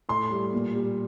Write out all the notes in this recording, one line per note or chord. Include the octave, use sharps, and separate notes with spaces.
A2 C6
G3
A#2
G3